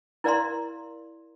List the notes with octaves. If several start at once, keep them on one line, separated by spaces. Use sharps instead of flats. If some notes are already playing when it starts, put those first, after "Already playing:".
E4 A#4 D5 F5 A#5 C6